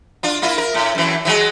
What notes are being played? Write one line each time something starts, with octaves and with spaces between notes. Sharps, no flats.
D4 F4
A#3 E4 F4
A#4
A2
F#2 E3
E3 F#3 G#3